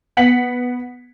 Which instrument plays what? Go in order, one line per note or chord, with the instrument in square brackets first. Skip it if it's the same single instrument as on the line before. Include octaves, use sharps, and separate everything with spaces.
[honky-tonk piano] B3 F#5 B6 C#7 F#7